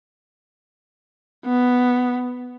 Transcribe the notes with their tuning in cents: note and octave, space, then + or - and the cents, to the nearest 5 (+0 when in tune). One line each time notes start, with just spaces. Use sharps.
B3 +5